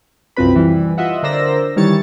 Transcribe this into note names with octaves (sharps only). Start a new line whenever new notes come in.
C2 F#2 F3 C4 B4 B5
E3 G3
F4 D#5 E5 F#5
D3 A#4 C5 D5 E6 A#6
D#3 E3 G3 C#5 A6 C#7